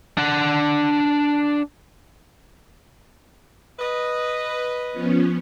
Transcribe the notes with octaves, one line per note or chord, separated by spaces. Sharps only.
D4 F#5
B4 D#5
F3 B3 C#4